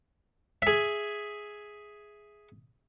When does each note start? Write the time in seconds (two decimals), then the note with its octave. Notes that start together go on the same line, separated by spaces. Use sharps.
0.62 G#4 E5